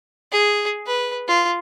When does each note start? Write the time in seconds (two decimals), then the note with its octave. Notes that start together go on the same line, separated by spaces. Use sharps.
0.32 G#4
0.87 B4
1.28 F4